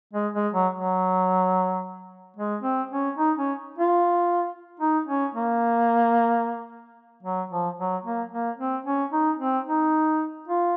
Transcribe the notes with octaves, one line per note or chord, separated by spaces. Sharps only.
G#3
G#3
F#3
F#3
G#3
C4
C#4
D#4
C#4
F4
D#4
C#4
A#3
F#3
F3
F#3
A#3
A#3
C4
C#4
D#4
C4
D#4
F4